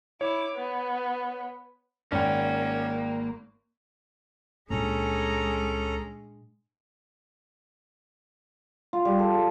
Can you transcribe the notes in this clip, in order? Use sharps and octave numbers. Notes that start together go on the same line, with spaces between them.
E4 C#5 D6
B3
G#1 A#3 C#4 D5 G5
C#2 A#2 G#3 C#4 D4 A4 A#5
F4
G3
A4
A4